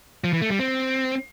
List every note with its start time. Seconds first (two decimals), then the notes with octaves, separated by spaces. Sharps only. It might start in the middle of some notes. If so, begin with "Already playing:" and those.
0.24 F3
0.33 E3
0.42 A3
0.50 G3
0.59 C4